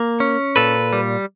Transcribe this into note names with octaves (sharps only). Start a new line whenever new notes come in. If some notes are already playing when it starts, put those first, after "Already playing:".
Already playing: A#3
C#4
A#2 A4 B4
G3